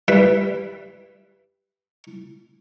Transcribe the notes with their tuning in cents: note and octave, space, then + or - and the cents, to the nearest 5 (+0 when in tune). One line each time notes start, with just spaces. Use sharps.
G3 +0 B4 +0 E5 +5